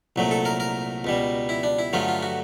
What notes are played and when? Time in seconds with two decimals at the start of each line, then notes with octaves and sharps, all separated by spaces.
0.16 C2 A#2 F#3 A3
0.31 A4
0.45 A#4
0.60 A#4
1.04 C#2 B2 G3
1.49 E4
1.63 D4
1.79 E4
1.93 G2 D3 F#3 A3 F4
2.08 F4
2.23 F#4